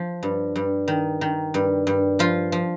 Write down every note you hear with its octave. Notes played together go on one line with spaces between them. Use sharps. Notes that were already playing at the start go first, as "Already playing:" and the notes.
Already playing: F3
G2
G2
D#3
D#3
G2
G2
F3 F4
F3